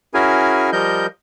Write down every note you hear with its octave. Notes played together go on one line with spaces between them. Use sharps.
C#4 E4 F#4 G#4 A#4 G#5
F3 G3 A#4 D#5 G6